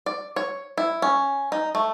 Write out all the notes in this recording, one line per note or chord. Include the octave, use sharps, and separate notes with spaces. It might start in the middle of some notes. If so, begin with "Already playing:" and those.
D5
C#5
E4
C#4
D#4
A3